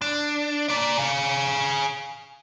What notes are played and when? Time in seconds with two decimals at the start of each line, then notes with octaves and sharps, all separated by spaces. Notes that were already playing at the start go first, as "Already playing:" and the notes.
0.02 D4
0.69 A#3 D5
0.97 G#4 F5